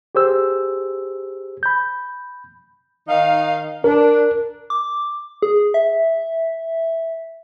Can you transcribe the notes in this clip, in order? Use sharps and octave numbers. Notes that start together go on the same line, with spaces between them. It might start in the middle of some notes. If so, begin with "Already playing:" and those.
G4 G#4 C5 E6
B5 G6
D#3 D#4 F5
D4 A#4
D6
G#4
E5